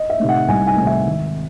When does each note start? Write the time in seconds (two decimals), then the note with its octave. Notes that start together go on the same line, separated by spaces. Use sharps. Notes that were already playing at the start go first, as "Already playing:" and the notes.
Already playing: D#5
0.10 E5
0.20 C3 D#3 A3
0.29 F#5
0.48 C2 G#5
0.67 G#5
0.77 C3 D#3 A3
0.87 E5
1.06 G#1